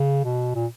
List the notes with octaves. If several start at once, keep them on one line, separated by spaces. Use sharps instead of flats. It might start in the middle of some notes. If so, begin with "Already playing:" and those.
Already playing: C#3
B2
A#2